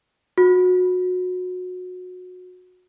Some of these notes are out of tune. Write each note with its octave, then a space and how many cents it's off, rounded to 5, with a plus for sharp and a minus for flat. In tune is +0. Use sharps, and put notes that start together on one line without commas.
F#4 -25